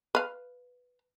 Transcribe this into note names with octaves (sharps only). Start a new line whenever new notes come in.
B4 F5